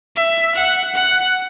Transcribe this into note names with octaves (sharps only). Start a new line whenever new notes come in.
E5
F#5
F#5